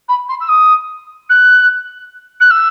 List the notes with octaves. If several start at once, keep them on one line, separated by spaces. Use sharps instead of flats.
B5
C6
E6
D#6
F#6
F#6
E6